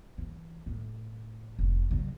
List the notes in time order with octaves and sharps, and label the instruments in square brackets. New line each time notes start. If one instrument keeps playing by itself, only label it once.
[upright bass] E3
A2
F1
C#3 F#3